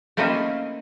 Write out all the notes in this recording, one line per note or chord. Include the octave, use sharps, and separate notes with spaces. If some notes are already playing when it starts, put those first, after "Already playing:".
A3 A#3 C4 C#4 D#4 E4